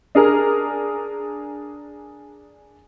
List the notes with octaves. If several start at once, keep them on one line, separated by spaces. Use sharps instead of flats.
D4 G#4 A#4